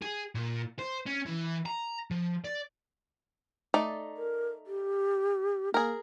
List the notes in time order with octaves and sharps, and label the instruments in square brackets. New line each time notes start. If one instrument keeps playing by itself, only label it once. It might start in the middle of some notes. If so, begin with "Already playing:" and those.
[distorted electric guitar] G#4
A#2
C5
C#4
E3
A#5
F3
D5
[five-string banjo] A3 D#4 D5
[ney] A#4
G4
[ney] A#3 [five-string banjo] G#4 A#4